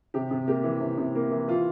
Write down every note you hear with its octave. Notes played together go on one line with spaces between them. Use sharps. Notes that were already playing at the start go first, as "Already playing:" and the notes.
C3 G4
C3
A#3 G4
E3
C3
C3
A#3
E3
E3 F4